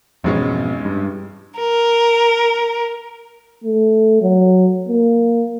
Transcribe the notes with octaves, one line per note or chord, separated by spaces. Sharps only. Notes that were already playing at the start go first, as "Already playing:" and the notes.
A1 F2 G#2 B2 G#3 C#4
G2
A#4
A3
F#3
A#3